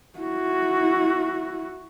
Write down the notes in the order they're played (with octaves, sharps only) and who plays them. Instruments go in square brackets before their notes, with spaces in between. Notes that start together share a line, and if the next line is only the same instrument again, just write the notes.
[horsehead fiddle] E4 F#4